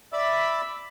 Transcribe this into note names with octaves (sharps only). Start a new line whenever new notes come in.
D5 E5 B5 D6 E6